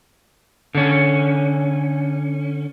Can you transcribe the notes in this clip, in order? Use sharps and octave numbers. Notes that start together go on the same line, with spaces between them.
D3 C#4